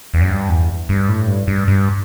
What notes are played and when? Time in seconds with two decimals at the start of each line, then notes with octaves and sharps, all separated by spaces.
0.14 E2
0.21 F#2
0.30 G2
0.49 E2
0.89 G2
1.09 A2
1.28 G2
1.47 G2
1.68 G2